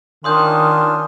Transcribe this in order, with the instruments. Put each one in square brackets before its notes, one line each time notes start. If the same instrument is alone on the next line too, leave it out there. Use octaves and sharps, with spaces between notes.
[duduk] D#3 [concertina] C#4 D4 F4 [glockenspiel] C6 D#6 G6